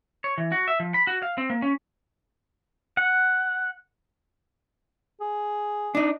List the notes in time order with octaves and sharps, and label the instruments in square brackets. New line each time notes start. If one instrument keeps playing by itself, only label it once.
[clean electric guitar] C#5
E3
F#4
E5
F3
B5
F#4
F5
C4
A#3
C#4
[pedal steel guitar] F#5
[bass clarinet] G#4
[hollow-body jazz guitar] D4 D#4